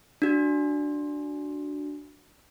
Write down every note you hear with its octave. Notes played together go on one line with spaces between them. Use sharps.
D4 F#4